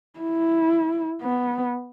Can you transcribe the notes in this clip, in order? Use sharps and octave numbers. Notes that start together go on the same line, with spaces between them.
E4
B3